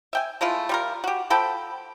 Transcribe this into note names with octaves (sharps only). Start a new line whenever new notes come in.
E5 G5 G#5
G#3 A3 E4 F4
G3 F4 A#4
F#4 G4
F3 A4 G5 B5